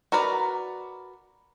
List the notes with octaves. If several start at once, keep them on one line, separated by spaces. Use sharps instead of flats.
F#4 A#4 B4 D5